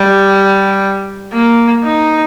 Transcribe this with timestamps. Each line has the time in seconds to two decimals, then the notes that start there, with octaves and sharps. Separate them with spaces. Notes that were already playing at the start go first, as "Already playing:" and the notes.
Already playing: G3
1.33 A#3
1.84 D#4